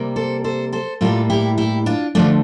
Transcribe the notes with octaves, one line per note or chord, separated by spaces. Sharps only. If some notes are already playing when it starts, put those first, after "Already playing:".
Already playing: C3 G3 A#3
A4 C5
A4 C5
A4 C5
A2 G3 A#3 F4 A4
E4 G4
E4 G4
D4 F4
D3 F3 A3 D4 F4